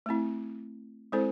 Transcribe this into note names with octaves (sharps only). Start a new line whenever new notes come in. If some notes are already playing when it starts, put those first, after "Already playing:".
A3 C4 E4
G#3 C4 E4 A4 C5